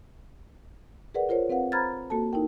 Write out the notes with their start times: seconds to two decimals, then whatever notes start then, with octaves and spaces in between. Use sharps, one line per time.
1.14 G#4 A#4 B4 D5 F#5
1.29 F4 A#4 C5 C#5
1.49 C4 B4 F5 F#5
1.72 C5 A#5 B5 F6 G#6 A6
2.10 A#3 F#4 A4 A5
2.33 D#4 E4 A#4 G5